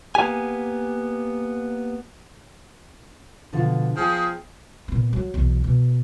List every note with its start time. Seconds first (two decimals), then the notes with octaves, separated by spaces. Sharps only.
0.15 A#3 B3 G4 G#5
3.53 B2 D3 F3
3.96 F3 G#4 G5
4.88 A#2 B3
5.13 F#3
5.34 B1 E2
5.64 B2